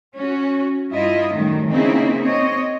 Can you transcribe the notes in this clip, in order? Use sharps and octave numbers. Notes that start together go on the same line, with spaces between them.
C#4 F#4
G2 E4 F4 D#5
F#2 A2 D#3 F#3 G3
C#3 A#3 C4 D#4 E4 G#4
C4 C#5 D#5